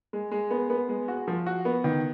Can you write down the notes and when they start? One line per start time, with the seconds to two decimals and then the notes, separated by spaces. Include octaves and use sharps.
0.13 G#3
0.31 G#3
0.51 B3
0.70 B3
0.89 G#3
1.08 F#4
1.28 F3
1.46 F#4
1.65 B3
1.84 D#3